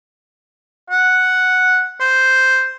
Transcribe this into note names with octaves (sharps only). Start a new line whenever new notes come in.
F#5
C5